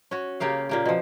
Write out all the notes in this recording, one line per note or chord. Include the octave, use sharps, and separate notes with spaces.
C#4 F#4
C#3 A#3 G4 F5
A#2 A#3 G4
B2 F3